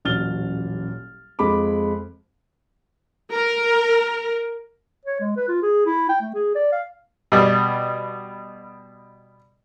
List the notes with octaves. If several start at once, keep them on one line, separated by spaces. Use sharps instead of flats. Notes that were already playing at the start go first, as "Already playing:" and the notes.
D#1 A1 F#3 F6 A6 G7
F2 G#3 B5 D6
A#4
C#5
G#3
B4
F4
G#4
E4
G5
A3
G#4
D5
F5
B2 G3